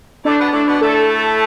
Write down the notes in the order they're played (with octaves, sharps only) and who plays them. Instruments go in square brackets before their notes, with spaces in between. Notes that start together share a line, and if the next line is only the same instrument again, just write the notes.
[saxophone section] A2 A3 [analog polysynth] D4
[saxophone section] B2 B3
[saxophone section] A2 A3 [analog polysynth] D4
[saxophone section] B2 B3
[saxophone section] A2 A3 [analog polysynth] A4
[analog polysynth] A4